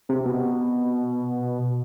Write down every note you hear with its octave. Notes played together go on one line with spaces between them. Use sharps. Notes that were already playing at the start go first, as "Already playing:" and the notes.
C3
B2